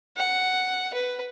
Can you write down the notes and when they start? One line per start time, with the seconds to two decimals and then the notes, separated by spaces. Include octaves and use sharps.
0.17 F#5
0.93 B4